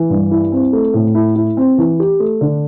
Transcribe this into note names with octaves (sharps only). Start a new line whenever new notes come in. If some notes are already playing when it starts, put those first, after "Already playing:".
Already playing: E3
G2
E4
C4
A3
A2
E4
E4
C4
E3
G4
A3
D3